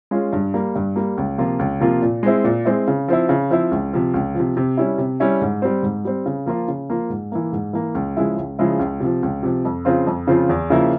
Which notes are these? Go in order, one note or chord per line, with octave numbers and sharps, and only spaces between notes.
G#3 C#4 F4
G2
G3 A#3
G2
G3 A#3
C#2
C3 F3 A#3 F4
C#2
C3 F3 A#3 F4
A#2
G#3 C4 E4
A#2
G#3 C4 E4
C#3
F3 C4 E4
C#3
F3 C4 E4
C#2
C3 F3
C#2
F3
C3
C3
G3 C#4 E4
C3
G3 C#4 E4
G#2
G3 C4
G#2
G3 C4
C#3
F3 A#3 F4
C#3
F3 A#3 F4
G#2
E3 A#3
G#2
E3 A#3
C#2
C#3 F3 G#3 E4
C#2
C#3 F3 G#3 E4
C#2
C3 F3
C#2
C3 F3
F2
C#3 F3 C4 F4
F2
C#3 F3 C4 F4
E2
C#3 F3 A#3 E4